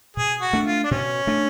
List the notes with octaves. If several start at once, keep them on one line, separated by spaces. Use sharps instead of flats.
B2 G#4
F#4
A3 D4
F4
D4
B2 C#4
A3 D4